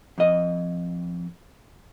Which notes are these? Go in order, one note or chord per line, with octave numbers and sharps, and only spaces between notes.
F2 D#5